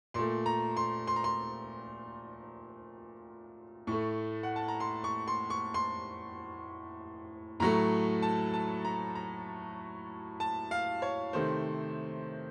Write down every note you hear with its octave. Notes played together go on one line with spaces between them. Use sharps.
A#2 A3 C6
A#5
C6
C6
A#5
C6
A2 A3 C#6
F#5
A5
A#5
C6
C#6
C6
C#6
C6
A2 F#3 A3 A#5
A5
A5
A#5
A#5
A5
F5
C#5
C3 D#3 A3 C5